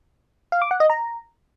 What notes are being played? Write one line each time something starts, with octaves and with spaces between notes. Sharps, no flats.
F5
D6
F#5
D#5
A#5